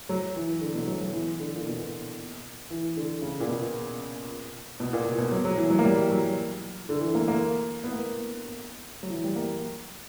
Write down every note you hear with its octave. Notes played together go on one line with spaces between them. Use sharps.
F#3
E3
D3
B2
F#3
F#3
E3
D3
A#2
B2
E3
D3
C#3
A#2
B2
B2
A#2
B2
B2
F#3
F#3
E3
F#3
A#3
G3
F#3
D3
E3
A#3
A#3
B3
A#3
F#3
E3
G3
A#3